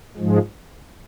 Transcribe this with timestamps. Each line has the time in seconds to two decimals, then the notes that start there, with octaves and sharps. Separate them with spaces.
0.17 G#2 F3 G#3